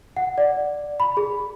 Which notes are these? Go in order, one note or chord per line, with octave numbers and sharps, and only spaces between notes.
F#5
D5
B5
G#4